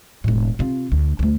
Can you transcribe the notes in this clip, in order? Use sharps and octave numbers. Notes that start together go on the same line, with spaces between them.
E1 A2
C3 F4
D2
D2 A3